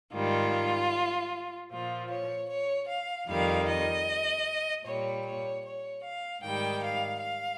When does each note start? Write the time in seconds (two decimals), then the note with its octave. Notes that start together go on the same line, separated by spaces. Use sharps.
0.13 G#2 D#3 G3 F4
1.71 A#2 F3 F4
2.10 C#5
2.49 C#5
2.88 F5
3.29 F2 D#3 G3 F5
3.67 D#5
4.85 A#2 G3 C#5
5.24 C#5
5.64 C#5
6.03 F5
6.42 G#2 D#3 G3 G5
6.83 F5
7.21 F5